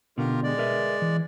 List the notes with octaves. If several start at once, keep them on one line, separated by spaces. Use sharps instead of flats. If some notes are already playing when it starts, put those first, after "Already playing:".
B2 D3 F4 G4 A#4
G#3 D5
A#4 B4 E5
E3